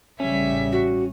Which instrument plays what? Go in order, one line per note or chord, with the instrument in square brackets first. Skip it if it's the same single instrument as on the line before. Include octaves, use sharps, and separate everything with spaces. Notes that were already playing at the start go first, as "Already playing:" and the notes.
[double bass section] A1 C#3 G3 [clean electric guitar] C#4 [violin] E5 B6
[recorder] F#4